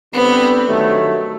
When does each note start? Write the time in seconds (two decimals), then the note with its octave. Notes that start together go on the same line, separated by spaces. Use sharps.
0.13 D3 G3 B3 C4
0.66 G2 D#3 F#3 A3